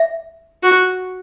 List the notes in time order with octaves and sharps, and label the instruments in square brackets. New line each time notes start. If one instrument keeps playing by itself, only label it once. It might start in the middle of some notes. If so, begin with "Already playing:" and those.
Already playing: [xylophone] E5
[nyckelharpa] F#4